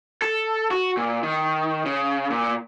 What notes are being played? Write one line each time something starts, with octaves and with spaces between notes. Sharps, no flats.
A4
F#4
A#2
D#3
C#3
A#2